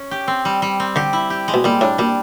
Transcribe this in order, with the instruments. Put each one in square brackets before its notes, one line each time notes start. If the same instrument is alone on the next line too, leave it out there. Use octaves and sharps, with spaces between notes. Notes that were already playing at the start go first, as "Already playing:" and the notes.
Already playing: [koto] C#4
G4
C4
G3
G3
C4
[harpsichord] D3 [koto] G4
[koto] E4
G4
G#3
[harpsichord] B2
[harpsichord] A#2 [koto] G3
[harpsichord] A2 [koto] D4
[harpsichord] A#2 [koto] G3